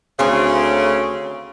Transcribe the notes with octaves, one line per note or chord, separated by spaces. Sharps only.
D2 C#3 C4 G#5